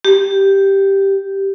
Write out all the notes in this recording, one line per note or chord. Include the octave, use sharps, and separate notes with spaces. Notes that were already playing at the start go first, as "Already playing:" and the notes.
G4